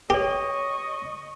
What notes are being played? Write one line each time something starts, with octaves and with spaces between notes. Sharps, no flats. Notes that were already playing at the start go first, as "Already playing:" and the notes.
G4 B4 C#5 D#5 C#6